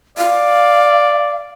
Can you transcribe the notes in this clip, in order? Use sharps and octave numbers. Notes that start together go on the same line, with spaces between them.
D5 F5